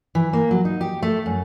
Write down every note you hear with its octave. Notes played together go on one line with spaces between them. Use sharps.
E3
A#3
F#3
D#4
G4
A3
F#2